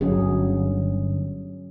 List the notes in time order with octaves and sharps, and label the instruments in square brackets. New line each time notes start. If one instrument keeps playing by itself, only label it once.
[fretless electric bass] G1 [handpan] F#3 C#4 G#4